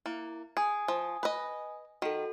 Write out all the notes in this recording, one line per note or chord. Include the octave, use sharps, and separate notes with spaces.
A#3 E4
G#4 G#5 D#6
F3
B4 D#5
D#3 F#4 A4